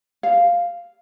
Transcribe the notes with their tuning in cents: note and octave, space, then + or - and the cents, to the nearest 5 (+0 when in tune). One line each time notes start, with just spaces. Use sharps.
F5 -5